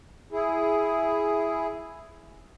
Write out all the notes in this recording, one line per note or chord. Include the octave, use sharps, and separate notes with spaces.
E4 G#4